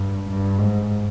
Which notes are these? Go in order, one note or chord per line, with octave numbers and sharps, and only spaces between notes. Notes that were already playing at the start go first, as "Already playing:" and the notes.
Already playing: G2
G2
G#2